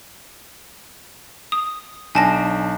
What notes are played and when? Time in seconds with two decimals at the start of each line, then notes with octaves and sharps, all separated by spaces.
1.52 D#6
2.15 B1 D4 G#5 A5 A#6 D7